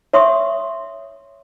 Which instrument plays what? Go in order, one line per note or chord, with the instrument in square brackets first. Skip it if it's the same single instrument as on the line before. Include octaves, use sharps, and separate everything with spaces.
[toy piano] C#5 E5 C6 C#6 D#6